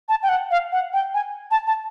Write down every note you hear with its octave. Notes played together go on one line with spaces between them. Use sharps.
A5
G5
F#5
F5
F#5
G5
G#5
A5
A5